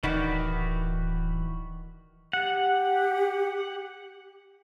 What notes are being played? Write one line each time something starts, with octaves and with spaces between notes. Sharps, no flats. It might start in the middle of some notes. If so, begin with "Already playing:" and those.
D1 D#3 E3 F#4 D5 F#5 B5
G4 F#5